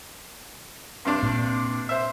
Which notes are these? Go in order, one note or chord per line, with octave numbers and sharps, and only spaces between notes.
G2 C3 D4
A#2
C5 E5